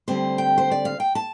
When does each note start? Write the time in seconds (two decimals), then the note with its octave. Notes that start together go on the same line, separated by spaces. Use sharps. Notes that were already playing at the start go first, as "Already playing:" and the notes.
0.08 D2 D3 G3 C4 C5
0.38 G5
0.58 C5
0.71 D5
0.85 F5
1.00 G5
1.15 A5